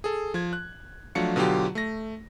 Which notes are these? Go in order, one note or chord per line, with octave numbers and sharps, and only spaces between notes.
G#4 A4
F3 G#6
F#6
F3 F#3 A3 D4 F5 C#7
B2 D3 F#3 F4 G4
A3 A#6